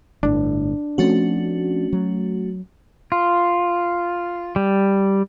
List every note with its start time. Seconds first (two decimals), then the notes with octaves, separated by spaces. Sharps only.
0.23 G1 A2 D4
0.98 F3 A3 C4 C#4 F#4
1.93 F#3
3.12 F4
4.56 G3